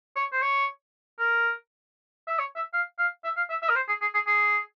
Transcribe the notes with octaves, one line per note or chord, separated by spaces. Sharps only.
C#5
C5
C#5
A#4
E5
C#5
E5
F5
F5
E5
F5
E5
E5
A#4
C5
G#4
G#4
G#4
G#4